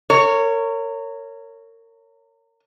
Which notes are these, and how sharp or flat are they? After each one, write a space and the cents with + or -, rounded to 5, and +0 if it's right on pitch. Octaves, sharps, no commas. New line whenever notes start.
A#4 -30 C#5 +0